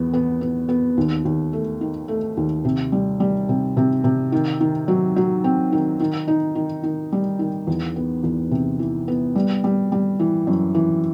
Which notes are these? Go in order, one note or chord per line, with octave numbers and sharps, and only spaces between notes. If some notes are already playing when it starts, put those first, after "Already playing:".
Already playing: E2 B3
B3
B3
B3
D#2
D#2
A3
D#3
A3
D#2
C3
G3
G3
C3
C3
C3
D#3
D#3
F#3
F#3
C4
D#3
D#3
D#4
D#3
D#3
G3
D#3
E2
B3
E2
C3
E3
B3
G3
G3
G3
E3
F#2
E3